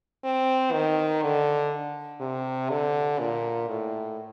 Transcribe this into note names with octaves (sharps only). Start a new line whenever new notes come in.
C4
D#3
D3
C3
D3
A#2
A2